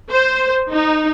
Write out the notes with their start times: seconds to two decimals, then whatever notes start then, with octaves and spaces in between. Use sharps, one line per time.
0.11 C5
0.71 D#4